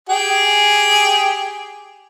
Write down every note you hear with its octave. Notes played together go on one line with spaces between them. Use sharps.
G4 G#4